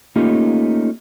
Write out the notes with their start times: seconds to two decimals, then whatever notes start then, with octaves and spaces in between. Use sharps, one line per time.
0.16 A3 A#3 C#4 D#4 F4 G4